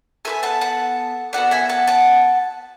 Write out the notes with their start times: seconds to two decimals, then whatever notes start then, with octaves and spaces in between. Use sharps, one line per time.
0.25 B3 F#4 A4 E5 G#5
0.43 F#5 A5
0.61 F#5 A5
1.33 B3 F#4 A4 D5 F#5
1.51 E5 G#5
1.69 F#5 A5
1.87 F#5 A5